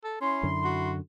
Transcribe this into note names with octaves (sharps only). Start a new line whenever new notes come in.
A4
C#4 E4 C6
F#2 D3
F#4